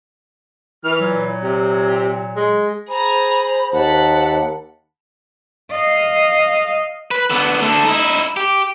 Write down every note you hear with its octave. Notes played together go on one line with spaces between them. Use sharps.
E3 F6
A#2 F#3
C3
G#3
G#4 C5 A#5 B5
D#2 F#5 A5 B5
D#5 F5
B4
D3 B3
D3 A3
D#4 E4
G4